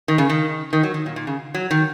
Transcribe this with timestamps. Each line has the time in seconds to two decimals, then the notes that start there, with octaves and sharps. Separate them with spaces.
0.08 D#3
0.18 C#3
0.30 D#3
0.73 D#3
0.83 F#3
0.94 D#3
1.06 A#2
1.16 A#2
1.27 C#3
1.54 F#3
1.71 D#3